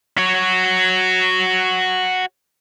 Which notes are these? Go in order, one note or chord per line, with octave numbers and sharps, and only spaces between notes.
F#4 C#5